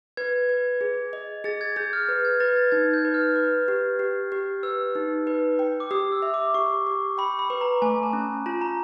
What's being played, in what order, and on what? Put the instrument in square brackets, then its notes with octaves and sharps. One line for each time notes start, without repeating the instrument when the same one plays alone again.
[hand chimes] B4 [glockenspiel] G#6
[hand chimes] B4
G#4
D#5
[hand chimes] G#4 [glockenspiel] A6
[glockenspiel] G#6
[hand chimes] G#4 [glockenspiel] G6
[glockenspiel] F6
[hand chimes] B4
[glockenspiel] G#6
[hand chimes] B4 [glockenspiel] A6
[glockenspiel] G#6
[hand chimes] D#4 [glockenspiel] G#6
[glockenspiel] G6
[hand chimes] B4
[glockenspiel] F6
[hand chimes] B4
G4
G4
G4
[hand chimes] B4 [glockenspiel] E6
[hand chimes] D#4
B4
G5
[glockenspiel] D6
[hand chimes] G4 [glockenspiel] D#6
[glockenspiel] E6
[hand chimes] E5
[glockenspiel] D6
[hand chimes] G4 [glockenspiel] C#6
[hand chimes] G4
[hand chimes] G5 [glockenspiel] B5
[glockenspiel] B5
[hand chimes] B4
[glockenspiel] A#5
[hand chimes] A3 [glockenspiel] G#5
[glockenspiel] A5
[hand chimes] C#4
[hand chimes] F4 [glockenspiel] A5
[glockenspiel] A#5